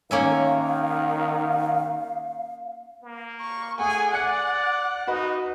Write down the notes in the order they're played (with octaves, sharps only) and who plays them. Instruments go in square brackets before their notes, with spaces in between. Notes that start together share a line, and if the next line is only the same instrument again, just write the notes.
[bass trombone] D#3 [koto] A#3 C#4 E5 [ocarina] F5
[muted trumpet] A#3
[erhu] C#6
[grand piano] A3 F#5 [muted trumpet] G#4 [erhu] G#5
[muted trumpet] D5 [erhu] F#5 [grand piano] F#6 C#7
[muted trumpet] D#4 [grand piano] F#4 B4 D#5